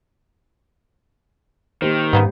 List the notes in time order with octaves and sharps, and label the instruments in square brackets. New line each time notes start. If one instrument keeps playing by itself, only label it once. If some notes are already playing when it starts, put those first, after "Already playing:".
[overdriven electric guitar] D#3 [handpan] A#3 G4 C5
[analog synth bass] G#2 [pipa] C#3 A#3 B3 [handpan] G3